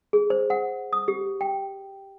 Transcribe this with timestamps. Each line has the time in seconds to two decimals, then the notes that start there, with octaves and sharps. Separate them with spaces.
0.13 G#4
0.30 C5
0.50 F#5
0.93 D#6
1.08 G4
1.41 G5